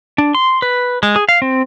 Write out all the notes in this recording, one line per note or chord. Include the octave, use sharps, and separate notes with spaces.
D4
C6
B4
G#3
G#4
F5
C4